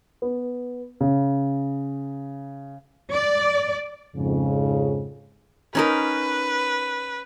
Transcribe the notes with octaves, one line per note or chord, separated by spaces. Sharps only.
B3
C#3
D5
F2 G#2 C#3
C#4 D#4 A#4 B4